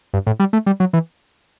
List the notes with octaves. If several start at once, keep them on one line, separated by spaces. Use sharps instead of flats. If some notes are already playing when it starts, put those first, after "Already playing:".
G2
A2
G3
A3
G3
F#3
E3